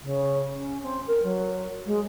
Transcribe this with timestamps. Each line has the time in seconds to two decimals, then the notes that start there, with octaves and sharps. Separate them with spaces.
0.01 C#3
0.54 C#4
0.82 C4
1.07 A#4
1.23 F#3
1.85 G#3